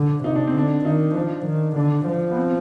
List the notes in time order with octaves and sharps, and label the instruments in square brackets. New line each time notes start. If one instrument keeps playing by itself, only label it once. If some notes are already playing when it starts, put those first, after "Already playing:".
Already playing: [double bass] D3
[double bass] C3 [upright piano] D#4
[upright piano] D4
C4
[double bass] D3 [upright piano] D4
[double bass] D#3 [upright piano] D#4
[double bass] F3 [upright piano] D4
[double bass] D#3
[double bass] D3 [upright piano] D4
[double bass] F3
[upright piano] B3
C4